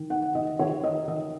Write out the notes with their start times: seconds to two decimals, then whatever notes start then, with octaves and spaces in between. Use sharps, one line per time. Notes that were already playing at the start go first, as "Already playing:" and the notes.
Already playing: D#3
0.10 D#4 F#5
0.35 D#3 D#5
0.59 D#3 C#5
0.84 D#4 D#5
1.08 D#3 D#5